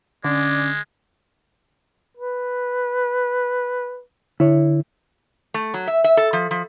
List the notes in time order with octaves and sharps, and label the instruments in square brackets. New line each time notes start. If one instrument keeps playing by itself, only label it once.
[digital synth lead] D3 [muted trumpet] G#3 [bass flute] C#4 [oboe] D5
[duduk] B4
[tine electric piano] D3 [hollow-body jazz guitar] E4 C#5
[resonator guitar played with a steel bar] A3
F#3
E5
E5
A4
F3
F3